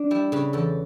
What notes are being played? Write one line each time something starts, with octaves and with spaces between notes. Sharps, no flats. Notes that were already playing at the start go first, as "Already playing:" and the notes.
Already playing: D4
G3 E4
C#3 B4
E2 A4